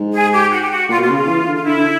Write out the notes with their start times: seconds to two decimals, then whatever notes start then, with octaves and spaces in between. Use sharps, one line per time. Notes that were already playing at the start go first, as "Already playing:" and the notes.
Already playing: G#2
0.13 G#4
0.32 G4
0.51 F#4
0.61 G4
0.71 F#4
0.89 A#2 F4
0.98 B2
1.01 F4
1.09 C#3
1.14 F4
1.27 E3
1.47 D3
1.55 F4
1.65 D3 E4
1.78 D3